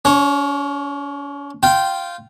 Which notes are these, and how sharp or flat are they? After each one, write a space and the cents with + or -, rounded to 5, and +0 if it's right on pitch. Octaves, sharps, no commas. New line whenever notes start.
C#4 +40 C#5 -15
F4 -5 G5 -15